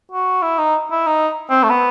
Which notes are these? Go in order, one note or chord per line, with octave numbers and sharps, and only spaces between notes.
F#4
E4
D#4
E4
D#4
C4
A3
B3